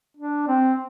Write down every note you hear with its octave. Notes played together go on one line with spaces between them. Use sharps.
D4
C4